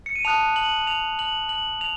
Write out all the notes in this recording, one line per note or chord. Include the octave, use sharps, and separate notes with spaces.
C#7
D#7
A5 D#6 F#6 F7
F#7
F7
F#7
F#7
F7